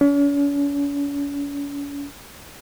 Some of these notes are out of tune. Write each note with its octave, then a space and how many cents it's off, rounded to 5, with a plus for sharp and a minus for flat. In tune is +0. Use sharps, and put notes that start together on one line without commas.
C#4 +45